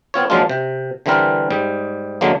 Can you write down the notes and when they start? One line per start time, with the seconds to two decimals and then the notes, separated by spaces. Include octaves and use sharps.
0.14 B3 C4 F4 C#5
0.30 F3 F#3 G#3 A#3 D4 F4
0.49 C3
1.06 D3 E3 G3 C4 A#4 B4
1.51 G#2 G3
2.21 D3 F#3 G#3 A#3